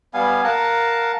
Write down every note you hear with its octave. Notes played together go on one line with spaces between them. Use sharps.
G3 B3 F5 G#5
A#4 F5 F#5 A5